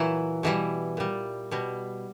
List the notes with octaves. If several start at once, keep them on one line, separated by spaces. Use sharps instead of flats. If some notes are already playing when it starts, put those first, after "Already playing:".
Already playing: A#2 E3 F#3 E4
B2 E3 G3 E4
A#2 G3
B2 G3